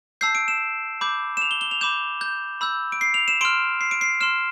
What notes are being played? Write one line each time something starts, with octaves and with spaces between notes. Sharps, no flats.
A5 E6 G6 C7
D7
E7
B5 D6 G6
E7
F7
G7
G7
F7
B5 D6 G6 E7
G6
B5 E6 G6
D7
C7
F7
E7
C6 F6 D7
C7
D7
C7
C6 F6 E7